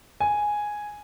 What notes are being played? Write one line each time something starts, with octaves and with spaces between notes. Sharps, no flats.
G#5